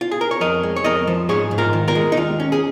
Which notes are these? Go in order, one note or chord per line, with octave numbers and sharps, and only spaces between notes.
F4
G#4
A#4
C#5
F2 A#4 D#5
G#3
C#5
F2 A#4 D#5
F3
G#2 G#4 C#5
G#2
F4 A#4
D#3
F4 A#4
G#3
D#4
D#2 F4
C#4
G#4